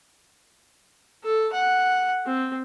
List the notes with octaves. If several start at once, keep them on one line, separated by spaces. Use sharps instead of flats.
A4
F#5
C4